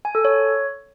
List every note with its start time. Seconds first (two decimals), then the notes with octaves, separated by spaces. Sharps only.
0.05 G#5
0.15 A4
0.25 C#5